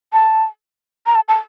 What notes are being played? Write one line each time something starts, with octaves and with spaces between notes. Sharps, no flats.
A5
A#5
A5
A5